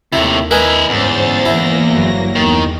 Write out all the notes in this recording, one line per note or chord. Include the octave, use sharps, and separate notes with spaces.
D#2 A2 C3 E4
E4 A#4 B4 D#5 G#5
G1 E2 G#2 C#4 C5 A6
E3 A#3 E4 A#6
G1 F#3
E2 D#3